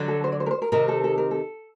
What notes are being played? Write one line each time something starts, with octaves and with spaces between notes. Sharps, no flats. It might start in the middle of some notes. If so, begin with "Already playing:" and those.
Already playing: D3 F#3
A4
C5
D5
C5
A#4
C5
A#4
C3 D#3 A#4
A4
A4
A#4
A4